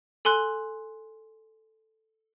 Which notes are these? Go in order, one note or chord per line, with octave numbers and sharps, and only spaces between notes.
A4 G#5 C6 F#6